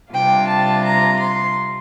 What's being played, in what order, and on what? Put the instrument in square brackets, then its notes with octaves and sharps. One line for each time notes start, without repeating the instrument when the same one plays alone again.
[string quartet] C3 G3 D4 F4 G5
A5
A#5
C6